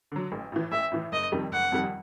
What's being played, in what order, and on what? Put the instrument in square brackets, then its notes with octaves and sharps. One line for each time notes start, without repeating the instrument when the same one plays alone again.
[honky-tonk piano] D3 F#3
A1
A2 E3
[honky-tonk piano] A1 [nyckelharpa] E5
[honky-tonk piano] A2 E3
[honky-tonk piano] F#1 [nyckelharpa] D#5
[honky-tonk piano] F2 C3 D#3 G3
[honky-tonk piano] F#1 [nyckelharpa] F#5
[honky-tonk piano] F2 C3 D#3 G3